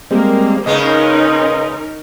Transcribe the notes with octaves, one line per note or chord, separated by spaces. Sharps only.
G3 G#3 A#3 C4
C#3 G#3 B3 C#4 D#4 A#4 D#5